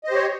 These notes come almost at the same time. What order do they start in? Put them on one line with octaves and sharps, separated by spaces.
D#5 C5 G4 C#5